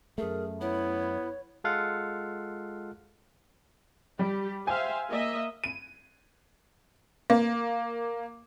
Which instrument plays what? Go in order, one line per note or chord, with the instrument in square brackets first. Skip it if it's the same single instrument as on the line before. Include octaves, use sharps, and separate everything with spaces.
[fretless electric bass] F#2 A3 [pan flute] G#4 [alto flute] A#4
[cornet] B3 [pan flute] E4 [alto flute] C#5
[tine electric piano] G#3 F4 A4 F5 F#5
[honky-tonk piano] G3 [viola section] G4
[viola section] C5 E5 F5 [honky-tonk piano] G5 G#5
[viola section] A#3 D#5 E5
[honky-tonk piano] D#7
A#3